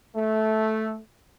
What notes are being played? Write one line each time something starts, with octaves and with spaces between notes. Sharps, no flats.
A3